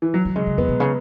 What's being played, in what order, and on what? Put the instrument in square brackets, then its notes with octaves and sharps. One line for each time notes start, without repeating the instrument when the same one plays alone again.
[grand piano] E3
F#3
[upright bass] D#3
[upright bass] C#3 [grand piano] G#3
[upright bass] C#3
[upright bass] E2 [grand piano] B3
[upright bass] B2
C#3